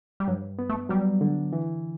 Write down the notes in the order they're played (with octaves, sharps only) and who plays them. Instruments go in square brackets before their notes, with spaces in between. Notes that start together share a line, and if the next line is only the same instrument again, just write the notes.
[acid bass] G3
[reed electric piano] G2 [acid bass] F#3
[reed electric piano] B3
[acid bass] A3
[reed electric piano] F#3 [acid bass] G3
[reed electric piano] D3
E3